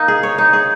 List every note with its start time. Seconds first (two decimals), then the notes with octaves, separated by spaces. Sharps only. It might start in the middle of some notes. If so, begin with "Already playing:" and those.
Already playing: A#3 D#4
0.08 G#4
0.23 C#5
0.38 D#4
0.53 G#4